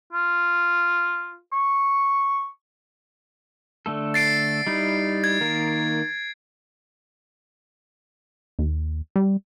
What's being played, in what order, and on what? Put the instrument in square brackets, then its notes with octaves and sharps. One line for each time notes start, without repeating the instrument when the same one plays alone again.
[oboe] F4
C#6
[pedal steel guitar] D3 A3 A4
[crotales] A6 C7 D7
[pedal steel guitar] G3 D#4 E4
[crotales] G#6
[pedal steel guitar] D#3 A#3 A#4
[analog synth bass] D#2
G3